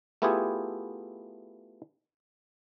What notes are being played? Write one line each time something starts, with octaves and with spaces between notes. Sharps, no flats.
A3 B3 E4 F4 G4 G#4